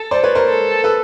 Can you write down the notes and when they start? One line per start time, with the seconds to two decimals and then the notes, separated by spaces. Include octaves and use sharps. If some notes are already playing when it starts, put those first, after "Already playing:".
Already playing: A4
0.11 C5 D5
0.24 B4 C#5
0.35 A#4 C5
0.48 A4
0.84 A4 B4